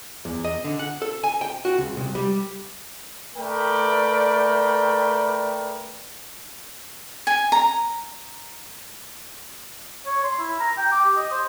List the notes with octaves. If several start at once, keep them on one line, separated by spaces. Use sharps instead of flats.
E2
D#5
D3
F#5
A4
G#5
G5
F#4
C#2
C2
G3
A3 A#4 B4 D5 G5
G#5
A#5
C#5
C6
E4
A#5
G5
D6
G4
D#5
C5